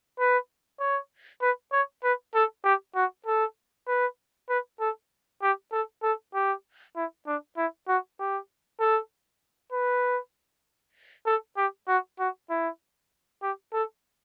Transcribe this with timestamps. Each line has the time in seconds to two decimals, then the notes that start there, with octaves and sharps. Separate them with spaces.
0.19 B4
0.80 C#5
1.41 B4
1.72 C#5
2.03 B4
2.35 A4
2.64 G4
2.95 F#4
3.26 A4
3.87 B4
4.49 B4
4.80 A4
5.42 G4
5.72 A4
6.03 A4
6.34 G4
6.96 E4
7.27 D4
7.57 E4
7.88 F#4
8.20 G4
8.80 A4
9.73 B4
11.26 A4
11.57 G4
11.88 F#4
12.19 F#4
12.50 E4
13.42 G4
13.73 A4